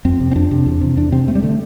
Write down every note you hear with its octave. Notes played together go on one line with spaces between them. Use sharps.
F2 C4
C3
C4
F2 D4
C3
E2
C3
E2 D4
C3 C4
G2 A3
G3
D3 A3